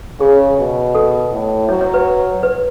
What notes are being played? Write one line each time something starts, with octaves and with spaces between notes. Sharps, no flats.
C#3 G#4
B2
A4
A2
F#3 C#5
C#5
B4
B4